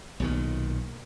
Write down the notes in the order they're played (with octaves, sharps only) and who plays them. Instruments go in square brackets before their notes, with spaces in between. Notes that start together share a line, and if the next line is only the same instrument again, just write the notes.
[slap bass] B1 A#2 D#3